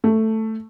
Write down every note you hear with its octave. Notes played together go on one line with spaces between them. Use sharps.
A3